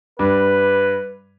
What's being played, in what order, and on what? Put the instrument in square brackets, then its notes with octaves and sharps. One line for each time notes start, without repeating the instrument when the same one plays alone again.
[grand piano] G2 D4 [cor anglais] B4